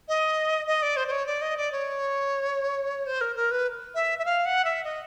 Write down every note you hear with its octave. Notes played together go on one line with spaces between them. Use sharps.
D#5
D#5
D5
C5
C5
C#5
D5
D#5
D5
C#5
C5
A#4
A#4
B4
E5
E5
F5
F#5
E5
D#5